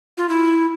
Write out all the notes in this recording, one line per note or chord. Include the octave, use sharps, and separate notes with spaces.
F4
E4